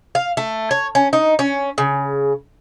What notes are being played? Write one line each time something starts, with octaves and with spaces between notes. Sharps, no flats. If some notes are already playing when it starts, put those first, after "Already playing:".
F5
A3
C#5
C#4
D#4
C#4
C#3